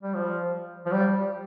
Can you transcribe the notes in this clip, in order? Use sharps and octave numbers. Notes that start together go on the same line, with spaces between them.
G3
F3
F3
G3